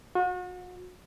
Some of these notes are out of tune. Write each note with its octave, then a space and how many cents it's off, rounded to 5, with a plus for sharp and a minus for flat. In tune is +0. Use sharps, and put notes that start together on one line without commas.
F#4 -40